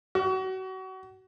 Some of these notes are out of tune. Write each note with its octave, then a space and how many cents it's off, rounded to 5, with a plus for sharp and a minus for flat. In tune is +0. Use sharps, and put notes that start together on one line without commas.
F#4 +30